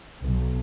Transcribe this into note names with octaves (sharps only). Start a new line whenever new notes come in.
B1